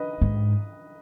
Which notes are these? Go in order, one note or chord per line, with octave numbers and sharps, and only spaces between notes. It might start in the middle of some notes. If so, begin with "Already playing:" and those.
Already playing: B4 D#5
G#2